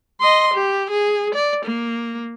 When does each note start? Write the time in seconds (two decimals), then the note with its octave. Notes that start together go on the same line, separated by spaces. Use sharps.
0.21 D#5 C6
0.54 G4
0.90 G#4
1.35 D5
1.65 A#3